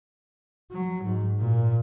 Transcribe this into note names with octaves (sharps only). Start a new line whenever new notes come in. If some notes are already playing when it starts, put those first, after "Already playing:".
F#3
G#2
A#2